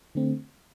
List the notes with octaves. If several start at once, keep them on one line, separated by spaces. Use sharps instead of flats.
D3 A3 C4